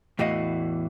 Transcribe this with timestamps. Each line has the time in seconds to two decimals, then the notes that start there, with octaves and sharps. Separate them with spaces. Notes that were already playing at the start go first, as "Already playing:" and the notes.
0.19 E2 A2 E3 F#4 D#5 F5